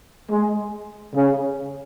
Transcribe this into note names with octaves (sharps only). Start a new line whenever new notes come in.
G#3
C#3